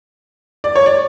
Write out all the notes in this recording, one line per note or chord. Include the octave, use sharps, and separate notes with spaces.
D5
C#5
D5